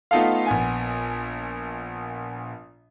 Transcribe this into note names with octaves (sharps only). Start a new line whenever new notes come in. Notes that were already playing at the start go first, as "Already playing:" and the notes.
A3 B3 D#4 F4 A4 F5
A#1 B3 G#5